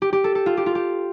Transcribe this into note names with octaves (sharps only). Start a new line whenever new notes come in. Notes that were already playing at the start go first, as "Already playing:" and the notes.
G4
G4
A4
A4
F4
G4
F4
G4